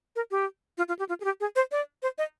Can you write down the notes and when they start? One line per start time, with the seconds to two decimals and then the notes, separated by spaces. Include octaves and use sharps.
0.16 A#4
0.31 G4
0.78 F4
0.88 F4
0.99 G4
1.09 F4
1.21 G#4
1.24 G4
1.40 G#4
1.56 C5
1.72 D5
2.03 C5
2.18 D#5